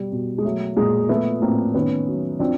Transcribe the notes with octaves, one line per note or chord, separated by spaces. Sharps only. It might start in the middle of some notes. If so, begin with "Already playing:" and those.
Already playing: B2 G3
B2
G#3
F#3 A3
A#2 G#3 A#3
F3 A3 B3
A2 A#3 C4
D#3 B3 C#4
F#3
F3 C4 D4